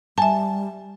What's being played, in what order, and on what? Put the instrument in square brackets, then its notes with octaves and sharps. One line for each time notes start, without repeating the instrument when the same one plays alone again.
[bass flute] G3 [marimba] E5 G#5 [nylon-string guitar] A5